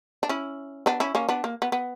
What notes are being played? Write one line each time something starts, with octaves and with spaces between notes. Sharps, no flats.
D4
C#4 E4
B3 D4
C#4 E4
A#3 C#4
B3 D4
A#3
B3
B3